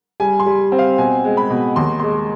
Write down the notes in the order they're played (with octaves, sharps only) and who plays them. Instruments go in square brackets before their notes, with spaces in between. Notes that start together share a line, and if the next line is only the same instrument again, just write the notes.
[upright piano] G3 G#5
C6
G3
C4
F5
B2 G#5
G#3
B5
B2
D#2 C6
G#3 C6